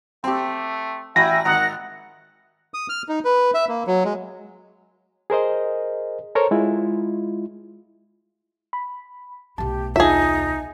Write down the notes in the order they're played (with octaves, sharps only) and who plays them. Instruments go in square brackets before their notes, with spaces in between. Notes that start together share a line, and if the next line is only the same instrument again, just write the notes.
[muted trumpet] A3 [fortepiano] C4 G4
[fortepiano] A1 F#4 B5 [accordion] E5 G5 G#5 [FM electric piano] A#6
[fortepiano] G#1 A#5 D#6 [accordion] D#3 [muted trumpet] F#5
[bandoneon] D#6
F6
D#4
B4
E5
A#3
F#3
G#3
[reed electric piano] G#4 A#4 C5 D#5
A4 A#4 C5 C#5 A#5
G#3 E4 F4
[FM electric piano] B5
[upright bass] B1 A3 [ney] G4 [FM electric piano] A5
[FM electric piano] D#2 F4 A5 [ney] D#4 [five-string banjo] G#4 E5